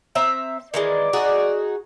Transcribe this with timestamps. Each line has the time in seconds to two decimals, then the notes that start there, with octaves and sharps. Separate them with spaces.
0.15 C4 E5 A#5
0.74 D#3 E3 G#3 D5
1.13 D#4 F#4 G#4